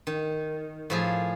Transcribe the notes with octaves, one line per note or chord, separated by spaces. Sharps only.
D#3
A2 F3 G#4